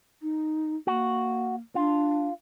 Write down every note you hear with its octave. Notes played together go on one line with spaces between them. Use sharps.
D#4
A#3 F#4
D4 F4